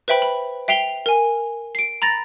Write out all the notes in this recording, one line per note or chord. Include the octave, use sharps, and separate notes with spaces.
B4 C5 E5 G5 B5
B5
E5 G5 C7 F7 G7
A#4 G#5
C7 D7
A#5 B5 A6 A#6